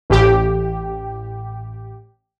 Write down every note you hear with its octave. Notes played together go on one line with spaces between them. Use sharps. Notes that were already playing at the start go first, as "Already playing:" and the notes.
A1 G4